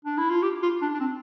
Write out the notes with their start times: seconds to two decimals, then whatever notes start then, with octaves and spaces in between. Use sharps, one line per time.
0.05 D4
0.18 E4
0.30 F4
0.43 G4
0.62 F4
0.82 D4
0.94 D4
1.00 C4